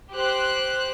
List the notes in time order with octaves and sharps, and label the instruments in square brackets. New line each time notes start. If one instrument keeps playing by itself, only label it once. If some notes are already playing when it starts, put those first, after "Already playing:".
[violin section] G4 C5 F#6